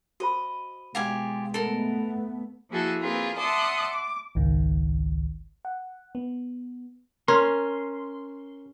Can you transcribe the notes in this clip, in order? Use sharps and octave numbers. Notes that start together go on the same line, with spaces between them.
F#4 C5 D#5 B5
B2 G#3 F4 G4 G#5
A3 B3 A4 A#4
F3 A#3 E4 F#4 G#4 A4
A#3 C4 F4 G#4 A#4 B4
D5 E5 F#5 A5 C6 D#6
D6
G#1 C#2 D#3
F#5
B3
C#4 A#4 C6